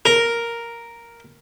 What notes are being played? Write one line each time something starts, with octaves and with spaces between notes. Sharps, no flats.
A#4